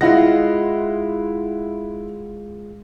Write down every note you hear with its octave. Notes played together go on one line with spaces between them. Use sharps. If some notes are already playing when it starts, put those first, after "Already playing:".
G#3 E4 F4 F#5 A#6